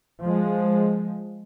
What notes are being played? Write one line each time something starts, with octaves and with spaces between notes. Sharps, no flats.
F3 G#3